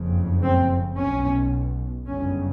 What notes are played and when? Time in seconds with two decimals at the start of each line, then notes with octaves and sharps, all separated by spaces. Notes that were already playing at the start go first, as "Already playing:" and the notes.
Already playing: F#1 F2 C#3
0.43 C4
0.98 B1 B2 C#4
2.06 G1 F#2 C#3 C#4